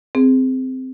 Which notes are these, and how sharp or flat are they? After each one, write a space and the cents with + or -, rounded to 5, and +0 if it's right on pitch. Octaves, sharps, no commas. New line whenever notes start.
C4 -10 G#4 +0